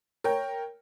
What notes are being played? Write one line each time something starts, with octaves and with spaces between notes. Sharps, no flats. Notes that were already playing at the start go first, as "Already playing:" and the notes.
A#4 C#5 G5